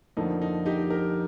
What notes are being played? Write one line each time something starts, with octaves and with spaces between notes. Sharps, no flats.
F2 D3 F3 A#3 D#4
D#4
D#4 G4
G4 A#4